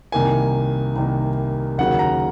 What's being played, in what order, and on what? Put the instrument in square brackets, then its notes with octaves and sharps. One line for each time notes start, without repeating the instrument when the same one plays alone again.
[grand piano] C2 C3 D#3 A#3 G#5
C2 C3 D#3 A#3
D#2 C#3 F#3 A#3 F#5
A#5